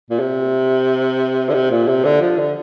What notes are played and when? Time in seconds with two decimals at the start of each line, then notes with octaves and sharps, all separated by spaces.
0.10 A#2
0.19 C3
1.50 D3
1.54 C3
1.71 A#2
1.88 C3
2.05 D3
2.21 F3
2.38 D3